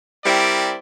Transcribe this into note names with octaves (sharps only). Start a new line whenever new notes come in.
G3 C4 E4 A#4 D5